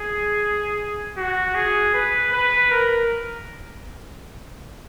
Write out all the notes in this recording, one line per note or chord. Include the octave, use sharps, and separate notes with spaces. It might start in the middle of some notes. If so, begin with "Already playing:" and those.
Already playing: G#4
F#4
G#4
B4
B4
A#4